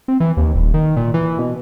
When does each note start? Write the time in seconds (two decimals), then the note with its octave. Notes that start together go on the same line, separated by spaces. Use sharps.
0.08 C4
0.20 E3
0.37 D#2
0.54 D#1
0.74 D#3
0.96 A#2
1.14 E3
1.39 B2